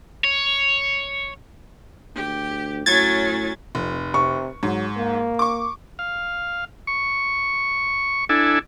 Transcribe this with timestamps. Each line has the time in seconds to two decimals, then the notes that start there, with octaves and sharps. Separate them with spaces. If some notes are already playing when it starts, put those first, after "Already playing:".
0.24 C#5
2.15 D2 G4
2.86 A2 F#3 C#4 G#6 A6
3.75 F1 F2
4.14 C3 C#6
4.63 G#2 F#3
4.97 A#3
5.39 C#6 D6
5.99 F5
6.87 C#6
8.29 D4 E4 A4 G#5